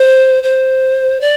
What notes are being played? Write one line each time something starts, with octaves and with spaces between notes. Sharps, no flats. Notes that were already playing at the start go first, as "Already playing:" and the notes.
Already playing: C5
C5
D5